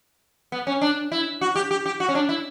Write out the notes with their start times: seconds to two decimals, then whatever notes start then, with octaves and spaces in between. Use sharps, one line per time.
0.52 B3
0.67 C#4
0.81 D4
1.12 E4
1.41 F#4
1.56 G4
1.71 G4
1.86 G4
2.00 F#4
2.08 C#4
2.15 D4
2.29 E4